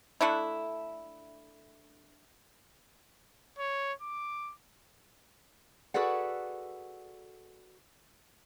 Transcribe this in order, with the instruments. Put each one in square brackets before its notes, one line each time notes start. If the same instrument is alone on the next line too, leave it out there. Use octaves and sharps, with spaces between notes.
[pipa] D3 A3 D4 E4
[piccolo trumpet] C#5
D6
[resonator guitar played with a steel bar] F#4 G#4 A4 B4 D5 F#5